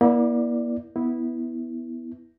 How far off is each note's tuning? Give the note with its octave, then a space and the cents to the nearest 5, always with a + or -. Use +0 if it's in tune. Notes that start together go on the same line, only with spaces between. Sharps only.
A#3 +45 E4 -15 D5 +0
B3 +0 E4 -15